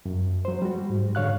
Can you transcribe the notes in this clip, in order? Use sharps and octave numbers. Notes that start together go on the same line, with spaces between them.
F#2
F#3 C5
G3 F#4
G#2
G#2 D3 C#5 F5 F#6